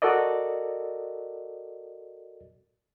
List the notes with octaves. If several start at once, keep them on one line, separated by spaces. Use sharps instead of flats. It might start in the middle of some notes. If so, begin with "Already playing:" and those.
F#4 A4 A#4 D5 D#5